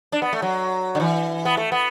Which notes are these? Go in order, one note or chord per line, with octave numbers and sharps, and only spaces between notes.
D4
B3
A3
F#3
D3
E3
B3
A3
B3